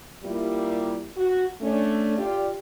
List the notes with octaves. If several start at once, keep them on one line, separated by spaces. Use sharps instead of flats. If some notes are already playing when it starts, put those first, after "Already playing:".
G3 A#3 E4 F4 G4
F#4
A3 C#4 D4
F4 G4 D5